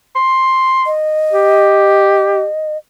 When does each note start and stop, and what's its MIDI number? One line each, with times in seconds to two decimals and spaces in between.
0.16 0.90 84
0.86 2.77 75
1.33 2.45 67